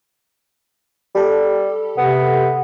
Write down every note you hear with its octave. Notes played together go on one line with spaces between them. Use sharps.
G3 G4 A4
C3 B3